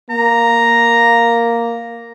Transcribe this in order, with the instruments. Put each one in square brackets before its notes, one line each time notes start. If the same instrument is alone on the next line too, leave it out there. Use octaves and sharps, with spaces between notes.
[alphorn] A#3 [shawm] A#5